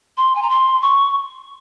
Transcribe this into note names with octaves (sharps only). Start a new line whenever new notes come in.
C6
G#5
A#5
C6
C#6